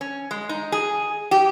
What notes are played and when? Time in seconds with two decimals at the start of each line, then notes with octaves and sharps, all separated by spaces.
0.01 C#4
0.31 G#3
0.49 D#4
0.72 G#4
1.31 G4